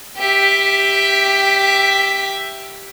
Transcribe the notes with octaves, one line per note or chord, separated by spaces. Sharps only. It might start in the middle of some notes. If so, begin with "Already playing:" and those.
G4 E5